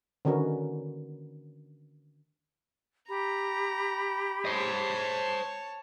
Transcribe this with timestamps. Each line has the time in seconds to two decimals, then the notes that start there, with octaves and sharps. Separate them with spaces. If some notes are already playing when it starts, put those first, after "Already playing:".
0.25 D3 D#3 C#4 F#4 A#4 B4
3.09 G4 A#5 B5
4.45 C5 C#5 D#5 A5